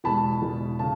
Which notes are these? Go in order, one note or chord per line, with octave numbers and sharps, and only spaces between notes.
E2 B2 G#3 A5 B5
E2 B2 G#3
C#3 A5